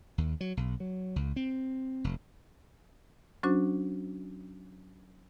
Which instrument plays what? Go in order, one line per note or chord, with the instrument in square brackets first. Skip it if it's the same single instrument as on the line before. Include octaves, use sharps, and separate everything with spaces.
[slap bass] D#2
F#3
B1
F#3
C#2
C4
F1
[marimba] F#3 C#4 D4 F#4 C5